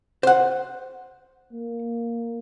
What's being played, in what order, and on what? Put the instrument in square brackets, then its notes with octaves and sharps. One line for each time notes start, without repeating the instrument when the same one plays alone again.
[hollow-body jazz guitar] C5 F#5
[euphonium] A#3